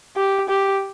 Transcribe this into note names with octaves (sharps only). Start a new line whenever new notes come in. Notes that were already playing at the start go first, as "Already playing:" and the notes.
G4
G4